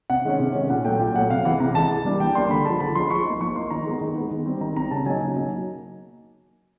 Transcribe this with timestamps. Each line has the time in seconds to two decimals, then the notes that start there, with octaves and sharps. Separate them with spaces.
0.10 C3 F#5
0.25 D#3 G#3 C#4
0.40 C3
0.55 D#3 G#3 C#4
0.70 A#2 F#5
0.85 F#3 A3 G5
1.00 A#2 G5
1.15 F#3 A3 F#5
1.30 C3 F5
1.45 E3 G#3 F#5
1.60 C3 A#5
1.75 E3 G#3 A5
1.90 E3
2.05 G3 A#3 D4
2.20 E3 G5
2.35 G3 A#3 D4 C6
2.51 D3 B5
2.65 F3 G#3 A5
2.80 D3 B5
2.95 F3 G#3 C6
3.10 F3 C#6
3.26 A#3 D#4
3.41 F3 C#6
3.55 A#3 D#4 C6
3.70 D#3 A#5
3.86 G#3 B3
4.01 D#3
4.16 G#3 B3
4.31 D#3
4.46 G3 C4
4.61 D#3 A#5
4.76 G3 C4 A#5
4.91 C#3 A5
5.06 F#3 A#3 D#4 G#5
5.21 C#3
5.36 F#3 A#3 D#4